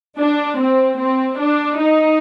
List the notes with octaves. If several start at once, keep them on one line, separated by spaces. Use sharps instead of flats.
D4
C4
C4
D4
D#4